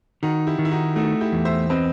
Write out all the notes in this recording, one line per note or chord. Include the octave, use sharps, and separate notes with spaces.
D#3 D#4 F#4
E4 G4
D#3
E4
D#4 F#4
A3 D#4 F#4
E4 G4
E2
C5 E5
C4 B4 D#5